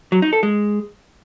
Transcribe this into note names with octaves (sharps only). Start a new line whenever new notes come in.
F#3
D#4
A4
G#3